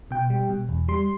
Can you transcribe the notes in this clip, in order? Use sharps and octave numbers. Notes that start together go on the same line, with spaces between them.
B2 G5
G3
B2
E2
G3 C6